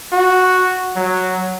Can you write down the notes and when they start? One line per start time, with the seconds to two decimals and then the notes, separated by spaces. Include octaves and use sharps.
0.13 F#4
0.96 F#3